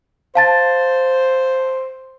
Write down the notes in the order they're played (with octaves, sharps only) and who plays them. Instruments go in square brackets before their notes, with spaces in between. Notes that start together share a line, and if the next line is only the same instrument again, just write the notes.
[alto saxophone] C5 [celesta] F5 A5 A6